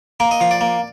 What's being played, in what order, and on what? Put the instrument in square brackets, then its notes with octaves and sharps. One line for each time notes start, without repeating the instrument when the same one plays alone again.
[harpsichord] A#3 A#4
D#5
F3 F5
D5
A#3